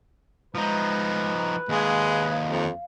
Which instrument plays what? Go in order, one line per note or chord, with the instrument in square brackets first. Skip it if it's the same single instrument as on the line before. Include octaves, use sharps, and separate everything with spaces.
[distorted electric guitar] F3 D#4 [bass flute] G#3 [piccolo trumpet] B4
[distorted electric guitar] D#2 G#4 [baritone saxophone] G#3 [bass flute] F5
[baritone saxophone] F2